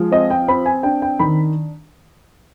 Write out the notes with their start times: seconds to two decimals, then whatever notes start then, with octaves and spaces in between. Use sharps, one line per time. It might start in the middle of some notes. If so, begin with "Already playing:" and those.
Already playing: F3 G#3
0.12 C4 D#5
0.30 G5
0.48 C4 B5
0.66 G#5
0.83 D4 G5
1.02 G5
1.19 D#3 B5